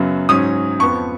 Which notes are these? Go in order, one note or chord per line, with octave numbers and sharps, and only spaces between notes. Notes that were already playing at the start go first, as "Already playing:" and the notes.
Already playing: F#2 C#3 F#3 B3
G#2 F#3 C#4 D#6
F2 F3 B3 C#6